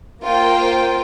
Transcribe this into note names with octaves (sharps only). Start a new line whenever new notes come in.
A#3 F4 C5 G5